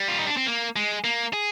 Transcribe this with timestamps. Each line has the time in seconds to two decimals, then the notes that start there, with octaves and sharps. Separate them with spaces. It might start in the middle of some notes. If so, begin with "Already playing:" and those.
Already playing: G3
0.08 F4
0.18 D#4
0.27 D4
0.37 C4
0.47 A#3
0.76 G#3
1.04 A#3
1.33 G#4